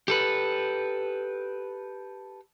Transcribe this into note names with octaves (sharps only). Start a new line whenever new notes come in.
G4 A4 B4